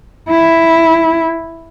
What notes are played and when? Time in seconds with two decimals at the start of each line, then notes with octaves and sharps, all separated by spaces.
0.29 E4